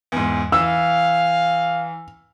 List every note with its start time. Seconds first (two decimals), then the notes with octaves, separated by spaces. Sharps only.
0.12 E2 G#2
0.52 E3 F5 E6